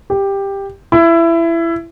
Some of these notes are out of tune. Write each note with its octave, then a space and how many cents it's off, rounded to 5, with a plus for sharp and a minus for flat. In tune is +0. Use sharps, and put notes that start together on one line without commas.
G4 +10
E4 +20